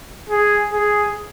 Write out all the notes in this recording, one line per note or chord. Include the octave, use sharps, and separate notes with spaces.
G#4
G#4